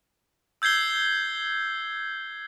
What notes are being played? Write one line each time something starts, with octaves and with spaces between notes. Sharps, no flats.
E6 G6 G#6 C7 G7